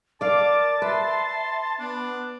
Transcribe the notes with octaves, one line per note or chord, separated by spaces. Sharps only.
A#4 D5 F5 A5 D6
B4 E5 C6
B3 D4